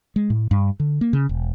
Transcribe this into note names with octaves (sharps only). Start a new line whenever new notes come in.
G#3
A2
G2
D3
A#3
C#3
E1